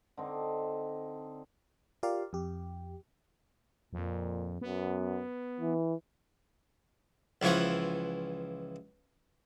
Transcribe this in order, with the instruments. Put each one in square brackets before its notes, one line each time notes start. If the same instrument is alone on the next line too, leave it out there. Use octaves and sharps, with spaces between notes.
[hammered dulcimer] D3 C4 D#4
[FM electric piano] F4 G4 A#4 D5 F5
F2 G4
[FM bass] F2 [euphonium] A#2
[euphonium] F#2 [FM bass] B3
[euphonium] E3
[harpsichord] C#2 E3 F3 C#5 F#5